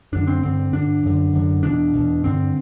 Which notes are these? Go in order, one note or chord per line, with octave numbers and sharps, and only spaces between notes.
F#2 D3 D4
C4
G2 D3 C4
G2 D3 D4
F#2 D3
F#2 D3
E2 B2 D4
E2 B2
G2 D3 C4